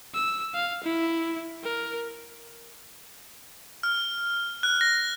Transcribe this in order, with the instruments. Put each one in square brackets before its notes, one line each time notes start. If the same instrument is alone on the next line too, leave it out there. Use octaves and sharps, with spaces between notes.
[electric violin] E6
F5
E4
A#4
[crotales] F6
F#6
A#6